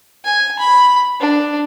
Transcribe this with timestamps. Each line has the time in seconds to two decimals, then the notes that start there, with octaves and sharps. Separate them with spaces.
0.24 G#5
0.59 B5
1.20 D4